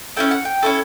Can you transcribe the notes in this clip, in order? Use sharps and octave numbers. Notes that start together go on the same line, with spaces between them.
C#4 E4 A4 G5
F#5
G5
C#4 E4 A4